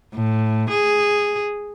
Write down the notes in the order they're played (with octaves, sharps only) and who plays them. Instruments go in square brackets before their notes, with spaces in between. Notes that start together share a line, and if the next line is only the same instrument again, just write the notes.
[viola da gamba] A2
G#4